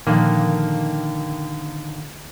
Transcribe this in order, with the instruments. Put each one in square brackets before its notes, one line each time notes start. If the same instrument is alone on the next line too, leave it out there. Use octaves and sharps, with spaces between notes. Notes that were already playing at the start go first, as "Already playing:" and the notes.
[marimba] A#2 F3 [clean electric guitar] D3 D#3 A#3